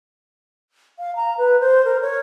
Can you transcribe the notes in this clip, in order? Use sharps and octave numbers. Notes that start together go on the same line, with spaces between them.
F5
A#5
B4
C5
A#4
C#5